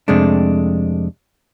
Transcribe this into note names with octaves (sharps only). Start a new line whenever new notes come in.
F2 C3 G#3 A3 D4